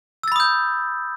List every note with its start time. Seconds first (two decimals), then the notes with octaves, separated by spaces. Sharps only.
0.23 E6
0.28 A6
0.32 B5
0.36 D#6
0.40 G6